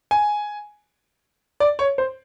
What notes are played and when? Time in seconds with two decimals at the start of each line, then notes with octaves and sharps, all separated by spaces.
0.11 G#5
1.60 D5
1.79 C#5
1.98 C5